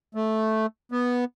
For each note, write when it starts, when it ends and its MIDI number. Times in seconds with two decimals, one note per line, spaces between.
0.15 0.66 57
0.92 1.25 59